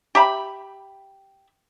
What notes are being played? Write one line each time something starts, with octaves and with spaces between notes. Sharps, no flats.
G4 E5 A#5 B5